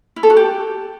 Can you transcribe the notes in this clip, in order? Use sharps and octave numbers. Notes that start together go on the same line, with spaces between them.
E4
A4
F#4
G4